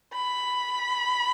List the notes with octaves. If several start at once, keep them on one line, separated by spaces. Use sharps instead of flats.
B5